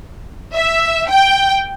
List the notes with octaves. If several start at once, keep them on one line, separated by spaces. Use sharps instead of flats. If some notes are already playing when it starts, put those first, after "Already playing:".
E5
G5